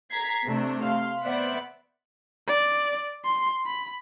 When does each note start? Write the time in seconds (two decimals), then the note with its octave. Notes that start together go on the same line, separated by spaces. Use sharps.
0.10 A#5 G#6 B6 C7
0.46 C3 A3 D4
0.84 F5 C6
1.23 B3 C5 D5 E5 F#5 B5
2.47 D5
3.25 C6
3.66 B5